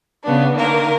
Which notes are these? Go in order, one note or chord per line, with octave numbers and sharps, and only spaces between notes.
C#3 B3 D4
D3 D#3 A#3 A#4